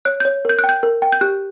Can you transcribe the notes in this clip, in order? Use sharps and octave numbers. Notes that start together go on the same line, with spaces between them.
C#5 F#6
C#5 G6
A#4 G6
F#6
G5
G6
A#4
G5
G6
G4 F#6